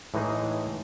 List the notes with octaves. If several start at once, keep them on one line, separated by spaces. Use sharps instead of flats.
A2 E3 G#3 D#4 G#4